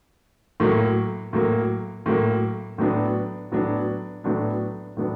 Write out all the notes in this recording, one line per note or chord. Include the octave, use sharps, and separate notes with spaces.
A2 F#3 A#3
A2 F#3 A#3
A2 F#3 A#3
A2 F#3 B3 D4
A2 F#3 B3 D4
A2 F#3 B3 D4
A2 F#3 B3 D4